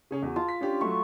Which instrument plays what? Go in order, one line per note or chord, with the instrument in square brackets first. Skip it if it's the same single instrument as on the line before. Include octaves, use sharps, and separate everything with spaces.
[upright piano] C#3 C#4 G#4
E2 F#4
[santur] F4 [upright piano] A5
[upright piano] B6
C#4 D4 G4
[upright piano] F#3 A3 [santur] C#6